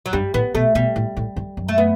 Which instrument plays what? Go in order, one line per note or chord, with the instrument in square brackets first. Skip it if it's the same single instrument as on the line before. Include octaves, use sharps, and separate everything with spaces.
[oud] F#3
[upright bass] G2 [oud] G3
[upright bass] A2 [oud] B3
[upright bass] B2 [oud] A3
[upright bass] B2 [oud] G3
[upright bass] A2
A2
G2
F#2
[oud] A3
B3